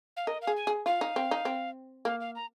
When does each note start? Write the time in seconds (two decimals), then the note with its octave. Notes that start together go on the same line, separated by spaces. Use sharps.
0.17 F5
0.27 A#4 D#5
0.42 F5
0.47 G#4
0.57 G#5
0.67 G#4
0.86 F4 F5
1.01 D#4
1.16 C4
1.31 D#4
1.45 C4
2.05 A#3 F5
2.20 F5
2.35 A#5